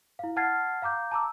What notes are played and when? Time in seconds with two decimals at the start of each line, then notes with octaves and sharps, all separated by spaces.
0.19 E4 F5
0.36 F#5 A5 F6 G#6 A6 C7
0.82 F5 A#5 D6 G6
1.11 A5 A#5 D6 E6